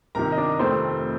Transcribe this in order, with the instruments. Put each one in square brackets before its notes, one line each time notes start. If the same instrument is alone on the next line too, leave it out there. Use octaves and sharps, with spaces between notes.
[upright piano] C2 C3 D#3 A#4 A#5
D#5
D4 D5
F1 F2 D#3 A3 C4 C5